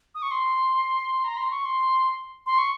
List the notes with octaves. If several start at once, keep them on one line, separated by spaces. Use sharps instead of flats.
D#6
C#6
C6
A#5
C6
C#6
C6
C6
C#6